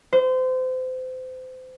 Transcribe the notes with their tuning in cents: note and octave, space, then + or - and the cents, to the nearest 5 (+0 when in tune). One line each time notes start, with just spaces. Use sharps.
C5 -30